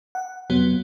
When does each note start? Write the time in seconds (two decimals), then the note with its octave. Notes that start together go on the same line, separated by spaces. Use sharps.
0.15 F#5
0.50 F2 C3 F#3 B3